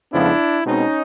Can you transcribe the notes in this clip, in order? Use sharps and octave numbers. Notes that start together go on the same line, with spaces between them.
F2 C#3 F3 G#3 B3 D4 E4
B2 G#3 C4 C#4 D#4